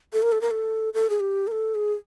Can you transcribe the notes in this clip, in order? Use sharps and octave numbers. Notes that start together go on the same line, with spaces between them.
A4
A#4
A4
A#4
A4
A4
G#4
G4
A#4
A4
G#4